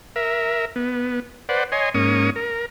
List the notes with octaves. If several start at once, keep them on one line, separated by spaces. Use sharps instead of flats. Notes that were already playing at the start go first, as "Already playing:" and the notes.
A#4 E5
B3
B4 C5 D5 F#5
C#5 D#5 G#5 C6
G#2 A#3 C#4 C#6 D#6
A#4